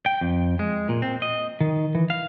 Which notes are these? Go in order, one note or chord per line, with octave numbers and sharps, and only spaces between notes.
G5
F2
G#3
A#2
C4
D#5
D#3
E3
F5